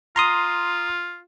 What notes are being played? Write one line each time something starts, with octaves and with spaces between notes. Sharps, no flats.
F4 A#5 C6 D#6